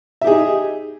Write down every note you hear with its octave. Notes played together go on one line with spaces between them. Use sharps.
D#4 G4 G#4 E5